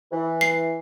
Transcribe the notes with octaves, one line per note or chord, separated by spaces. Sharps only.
E3
C7